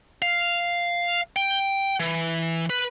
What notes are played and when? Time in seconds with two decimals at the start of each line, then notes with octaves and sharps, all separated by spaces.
0.22 F5
1.36 G5
2.00 E3
2.70 B4